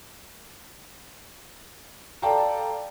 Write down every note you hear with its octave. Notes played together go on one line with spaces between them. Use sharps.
A4 D5 F5 G5 A5 A#5